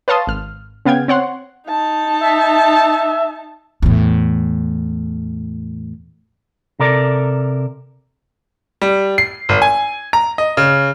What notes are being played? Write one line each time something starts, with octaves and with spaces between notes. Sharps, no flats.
B4 C#5 F5 A5 C6 D#6
G#1 F6
C#3 B3 F5 G5 G#6
C4 C#5 F#5 C6
D#4 A5
E5
E2 A2
C3 A4 A#4 D5
G3
C7
G#1
G#5
A#5
D#5
C#3